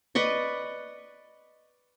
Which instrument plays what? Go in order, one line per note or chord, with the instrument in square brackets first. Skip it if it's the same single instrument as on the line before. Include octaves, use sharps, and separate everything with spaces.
[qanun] B4 D5 D#5 C#6